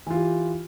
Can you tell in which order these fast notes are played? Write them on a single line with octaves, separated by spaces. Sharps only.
E3 F4 G4